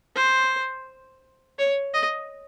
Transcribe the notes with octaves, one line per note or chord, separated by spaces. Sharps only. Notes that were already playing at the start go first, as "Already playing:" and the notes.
C5
C#5
D#5